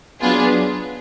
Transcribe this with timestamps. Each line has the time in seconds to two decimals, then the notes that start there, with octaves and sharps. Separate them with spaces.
0.21 F#3 B3 D4 F4 G#4